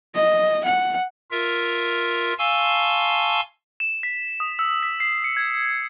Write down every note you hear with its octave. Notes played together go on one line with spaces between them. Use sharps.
D#5
F#5
F4 A#4 E5
F5 G#5 A5 C6 C#6 E6
E7
B6
D#6
E6
B6
C7
C#7
G#6